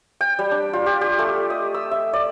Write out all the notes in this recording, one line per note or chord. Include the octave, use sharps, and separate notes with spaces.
G5
G3
D4
F4
G4
G4
A3
D#5
E6
E5
D5